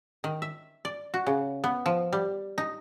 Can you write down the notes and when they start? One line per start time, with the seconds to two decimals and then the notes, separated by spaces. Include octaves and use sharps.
0.24 D#3
0.42 E5
0.85 D5
1.14 F#4
1.27 C#3
1.64 B3
1.86 F3
2.13 G3
2.58 D#4